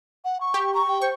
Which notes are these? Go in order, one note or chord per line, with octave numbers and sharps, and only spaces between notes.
F#5
C#6
G4
A#5 C#6
G5
C5 C#6